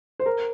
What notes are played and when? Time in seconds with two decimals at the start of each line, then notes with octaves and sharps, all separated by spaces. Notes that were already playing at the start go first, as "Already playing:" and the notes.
0.20 C5
0.26 A#4